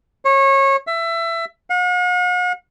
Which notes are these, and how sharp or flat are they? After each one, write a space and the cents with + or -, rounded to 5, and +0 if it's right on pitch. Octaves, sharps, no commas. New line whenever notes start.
C#5 -25
E5 +20
F#5 -45